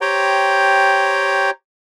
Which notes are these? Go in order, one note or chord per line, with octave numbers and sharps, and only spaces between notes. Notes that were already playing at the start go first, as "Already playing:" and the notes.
G4 C5 C#5 G5 A#5